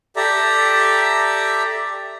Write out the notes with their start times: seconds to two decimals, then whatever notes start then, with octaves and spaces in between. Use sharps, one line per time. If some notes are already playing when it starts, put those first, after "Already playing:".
0.16 G4 A4 D5 E5 A#5